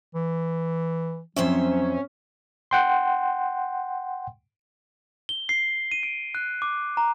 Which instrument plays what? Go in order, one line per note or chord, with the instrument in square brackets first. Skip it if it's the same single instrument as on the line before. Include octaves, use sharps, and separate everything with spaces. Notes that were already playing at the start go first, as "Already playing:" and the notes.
[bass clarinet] E3
[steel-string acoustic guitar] F2 C5 E5 [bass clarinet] F#3 [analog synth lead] C#4
[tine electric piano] F#5 G5 C6
[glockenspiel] G7
C7
D#7
D7
F#6
D6
A#5